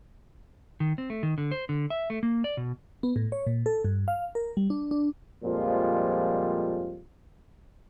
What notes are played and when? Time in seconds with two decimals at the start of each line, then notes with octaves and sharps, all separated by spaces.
0.80 D#3
0.98 C4
1.10 A3
1.23 D#3
1.38 D3
1.52 C5
1.69 D3
1.90 E5
2.10 A3
2.23 A#3
2.44 D5
2.57 B2
3.03 B3
3.16 A2
3.32 C#5
3.47 A#2
3.66 A4
3.85 G2
4.08 F5
4.35 A#4
4.57 G3
4.70 D4
4.91 D4
5.44 F2 A#2 F3 G3 G#3 F4